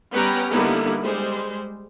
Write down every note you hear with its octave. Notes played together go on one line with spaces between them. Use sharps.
G3 B3 C#4 B4 G5 A#5
D3 G3 A#3 B3 D#4 E4
G3 G#3 C5